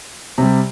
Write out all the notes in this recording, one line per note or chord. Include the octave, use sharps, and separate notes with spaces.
C3 G3